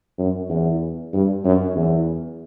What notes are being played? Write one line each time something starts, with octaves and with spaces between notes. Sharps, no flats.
F#2
E2
G2
F#2
E2